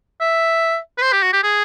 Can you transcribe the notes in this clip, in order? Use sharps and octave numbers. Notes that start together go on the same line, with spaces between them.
E5
B4
C5
G4
F#4
G4
G#4